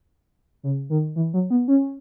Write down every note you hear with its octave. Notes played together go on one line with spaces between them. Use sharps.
C#3
D#3
E3
F#3
B3
C#4